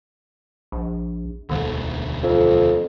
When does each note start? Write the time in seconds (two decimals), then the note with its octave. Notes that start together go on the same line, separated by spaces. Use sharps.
0.72 A#1
1.49 E1 D2 D3
2.23 F2